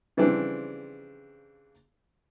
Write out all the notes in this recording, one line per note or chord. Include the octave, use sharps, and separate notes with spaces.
C#3 E3 F3 G3 C4 D4